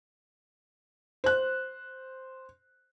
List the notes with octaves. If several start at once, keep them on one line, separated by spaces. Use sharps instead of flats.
C5 F#6